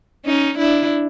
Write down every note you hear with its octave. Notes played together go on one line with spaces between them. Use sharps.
C#4 D#4
D4 E4